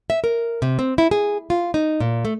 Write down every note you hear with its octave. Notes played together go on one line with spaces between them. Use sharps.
E5
A#4
C3
C4
E4
G#4
F4
D#4
A#2
A3